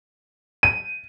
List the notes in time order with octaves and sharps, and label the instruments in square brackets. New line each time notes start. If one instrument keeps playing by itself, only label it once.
[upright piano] D#7